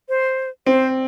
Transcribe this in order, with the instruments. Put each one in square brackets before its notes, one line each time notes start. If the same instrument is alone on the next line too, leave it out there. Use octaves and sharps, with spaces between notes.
[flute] C5
[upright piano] C4 [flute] C5